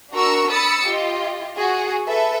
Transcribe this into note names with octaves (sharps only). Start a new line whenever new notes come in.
D4 F#4 A#4 A#5 C#6 E6
B5 D#6 E6 A6 C#7
F4 G4 D#5
F#4 G#4
A4 B4 E5